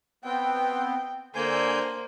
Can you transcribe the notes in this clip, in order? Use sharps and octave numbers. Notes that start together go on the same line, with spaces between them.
B3 C4 G5
D3 A#3 C5 G#5 G6